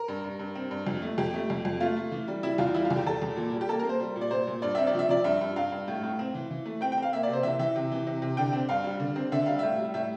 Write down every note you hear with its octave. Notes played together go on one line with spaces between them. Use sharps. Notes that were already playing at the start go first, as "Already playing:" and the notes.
Already playing: A#4
G2
G2
G2
C4
G2
F2
A3
F2 G4
A3
F2
F2
A3 F4
A3
E3
G3
G3 E4
E2 F4
G3 E4
F4
E2
G4
E2 A4
E2
A#2
G3
G4
A#3 A4
A#4
A#3
C5
G3
A#2
D5
A#2 C5
A#2
G2 D5
C4 E5
D5
F3 E5
F3 D5
G2 E5
G2
G2 F5
G2
A2
A2
C4
E3
E3
A3
C4 G5
G5
C4 F5
A#3 E5
D5
C3
C5
E3 E5
E3 E5
C3
E3
C3
C3
D3 G5
C4
G2 F5
G3
D3
C4
D3 E5
G3 F5
A2 E5
G3
A2 E5